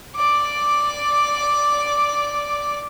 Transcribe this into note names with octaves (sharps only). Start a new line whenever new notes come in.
D5 D6